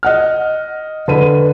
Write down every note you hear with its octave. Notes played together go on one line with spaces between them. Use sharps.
D#5 F#5 F6
D3 B4 D#7